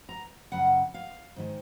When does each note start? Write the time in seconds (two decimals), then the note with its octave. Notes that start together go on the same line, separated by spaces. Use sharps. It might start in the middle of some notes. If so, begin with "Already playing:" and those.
0.09 A#5
0.52 F#2 C#3 F#5
0.94 F5
1.36 G#2 D#3 G#3